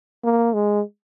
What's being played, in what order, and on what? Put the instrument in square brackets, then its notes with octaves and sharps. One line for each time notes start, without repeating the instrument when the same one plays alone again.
[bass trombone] A#3
G#3